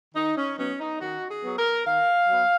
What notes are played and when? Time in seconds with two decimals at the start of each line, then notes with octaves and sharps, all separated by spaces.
0.15 D#3 D#4
0.37 C#4
0.58 F#3 B3 C#4
0.80 D#4
1.00 D#3 F#4
1.30 G#4
1.43 F#3 B3
1.58 A#4
1.86 D#3 F5
2.28 F#3 B3